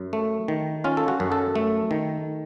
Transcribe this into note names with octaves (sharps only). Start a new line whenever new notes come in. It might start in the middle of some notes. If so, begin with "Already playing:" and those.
Already playing: F#2
A3
D#3
C#4 F4
A4
F#4
F#2
A4
A3
D#3